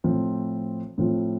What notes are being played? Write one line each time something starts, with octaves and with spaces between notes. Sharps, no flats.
A2 F3 C4 F4
A2 F3 C4 F4